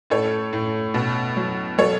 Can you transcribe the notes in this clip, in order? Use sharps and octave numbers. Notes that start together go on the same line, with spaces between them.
A2 A4 C#5
A2
B2
F#3
F#3 A4 C#5